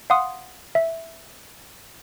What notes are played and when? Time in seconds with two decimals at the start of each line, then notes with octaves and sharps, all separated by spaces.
0.10 F5 F#5 C6 D#6
0.75 E5